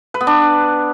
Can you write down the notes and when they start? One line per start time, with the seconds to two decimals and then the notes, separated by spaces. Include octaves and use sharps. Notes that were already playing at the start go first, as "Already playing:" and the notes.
0.14 B4
0.21 B3
0.27 D4